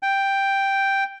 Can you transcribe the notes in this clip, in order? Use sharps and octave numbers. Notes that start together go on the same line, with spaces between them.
G5